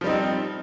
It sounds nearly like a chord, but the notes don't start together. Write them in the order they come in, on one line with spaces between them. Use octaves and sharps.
F3 G3 D#4 C4